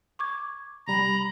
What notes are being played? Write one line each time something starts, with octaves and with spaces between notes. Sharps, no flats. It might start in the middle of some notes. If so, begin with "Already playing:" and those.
C#6 D6 G#6
C3 G3 A#5 B5